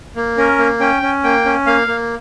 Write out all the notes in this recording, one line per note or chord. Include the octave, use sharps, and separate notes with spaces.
A#3
C#4 A#4
A#3
C#4 G5
C#4
A#3 G5
C#4
A#3 F5
A#3